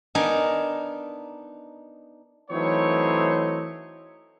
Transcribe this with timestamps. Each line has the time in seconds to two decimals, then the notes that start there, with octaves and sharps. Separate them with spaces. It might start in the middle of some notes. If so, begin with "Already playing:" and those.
0.15 B3 D4 D#4 A#4 G#5
2.51 E3 F#3 A3 C4 D#4 C#5